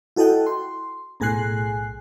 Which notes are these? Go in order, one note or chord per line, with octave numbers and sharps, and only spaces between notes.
E4 F#4 A4 D#5 F#5 G5
C6
B1 A2 G#4 G#5 F#6 C7